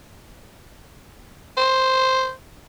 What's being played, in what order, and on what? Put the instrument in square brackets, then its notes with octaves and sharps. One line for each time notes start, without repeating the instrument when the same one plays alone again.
[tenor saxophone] C5